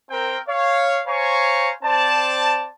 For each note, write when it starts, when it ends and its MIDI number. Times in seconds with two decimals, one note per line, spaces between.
0.10 0.37 60
0.10 0.37 70
0.10 0.37 79
0.47 1.00 73
0.47 1.00 77
1.06 1.70 72
1.06 1.70 73
1.06 1.70 77
1.06 1.70 80
1.06 1.70 82
1.06 1.70 85
1.82 2.68 60
1.82 2.68 72
1.82 2.68 74
1.82 2.68 81